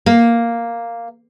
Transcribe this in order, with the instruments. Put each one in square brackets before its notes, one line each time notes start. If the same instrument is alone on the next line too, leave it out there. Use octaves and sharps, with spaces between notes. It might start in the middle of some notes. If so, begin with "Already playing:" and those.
[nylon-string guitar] A#3